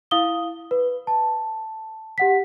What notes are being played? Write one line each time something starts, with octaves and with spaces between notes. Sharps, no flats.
E4 F5 D#6 G7
B4
A5
G4 F#5 B6